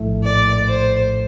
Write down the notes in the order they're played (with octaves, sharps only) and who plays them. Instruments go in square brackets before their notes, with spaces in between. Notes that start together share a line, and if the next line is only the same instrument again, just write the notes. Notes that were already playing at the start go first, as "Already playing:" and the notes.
Already playing: [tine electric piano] A#1 A2 A3
[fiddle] D5
C5